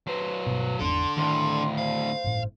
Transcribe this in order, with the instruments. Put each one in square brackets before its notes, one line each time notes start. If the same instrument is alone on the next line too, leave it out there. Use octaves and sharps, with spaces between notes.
[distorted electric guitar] F#3 C5 [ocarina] B4
[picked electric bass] G1 B2
[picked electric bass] G#1 E2 G#2 [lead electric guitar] D4 A4 [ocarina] C6
[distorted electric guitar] D2 A2 [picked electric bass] D#3 [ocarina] C6
[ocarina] C5 [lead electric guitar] F5
[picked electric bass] G1 A2